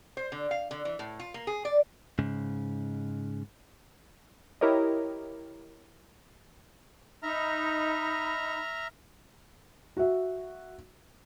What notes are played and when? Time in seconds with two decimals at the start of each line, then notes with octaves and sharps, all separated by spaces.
0.17 C5
0.32 D3
0.51 F5
0.71 D3
0.85 E3
0.99 A2
1.20 F4
1.34 A#3
1.47 G#4
1.65 D5
2.19 G#2 C#3
4.61 E4 G4 A#4 C#5 D#5
7.23 D#4 E5 A#5 B5 F6
9.97 F#4 E5